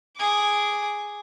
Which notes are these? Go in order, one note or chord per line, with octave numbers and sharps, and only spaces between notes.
G#4 D6